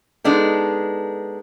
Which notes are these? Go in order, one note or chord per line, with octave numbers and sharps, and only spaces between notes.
G#3 B3 D4 D#4 A4